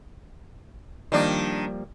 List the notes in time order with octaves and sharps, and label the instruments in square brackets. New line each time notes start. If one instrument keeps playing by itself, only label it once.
[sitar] D#3 D4 [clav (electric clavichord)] F3 G3 A#3